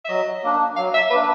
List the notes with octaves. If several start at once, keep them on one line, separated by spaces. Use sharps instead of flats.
E5
F#3 D#5
A#3 D4
F#3 F5
E5
A#3 D4 B4